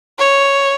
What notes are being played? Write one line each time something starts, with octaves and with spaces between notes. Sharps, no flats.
C#5